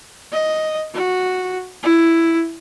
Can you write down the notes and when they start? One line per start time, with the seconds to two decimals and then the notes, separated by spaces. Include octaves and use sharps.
0.32 D#5
0.94 F#4
1.83 E4